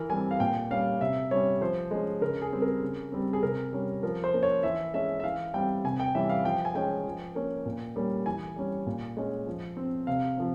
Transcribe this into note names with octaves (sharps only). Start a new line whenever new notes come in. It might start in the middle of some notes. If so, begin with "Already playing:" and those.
Already playing: E3 A#4
G3 C4 G#5
F5
A#2 G5
G3 C#4 F5
C3 E5
G3 C#4 C#5
F3 C5
G#3 C#4
C#3 A#4
G#4
G3 C4
A#4
C#3
G3 C4
G#4
C3 A#4
G3 C#4
F3 A#4
C5
A#3 C#4
C#5
E3 E5
G#3 C#4 E5
E5
E3 F5
G3 C4 G5
C3 G#5
G5
E3 G3 C#4 E5
F5
F3 G5
G#5
G#3 C#4 G5
F3
A#3 C#4
A#2
G3 A#3 C#4
E3 G#5
G3 C#4
A#2
G#3 C#4
F3
C4
C3 F5
F3 C4